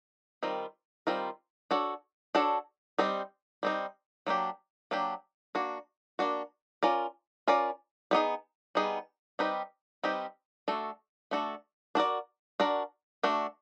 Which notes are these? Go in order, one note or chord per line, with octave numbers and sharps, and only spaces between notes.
D#3 G3 C4 F4 A#4
D#3 G3 C4 F4 A#4
D4 F#4 A4 C#5
D4 F#4 A4 C#5
G3 C4 D#4
G3 C4 D#4
F#3 A#3 D4 G4
F#3 A#3 D4 G4
A#3 D4 F#4
A#3 D4 F#4
C#4 F4 A#4 D5
C#4 F4 A#4 D5
G3 B3 D#4 G#4
G3 B3 D#4 G#4
G3 C4 D#4 G4 B4
G3 C4 D#4 G4 B4
A3 D4 F#4 A4
A3 D4 F#4 A4
D4 F#4 A#4 D5
D4 F#4 A#4 D5
A3 D4 F#4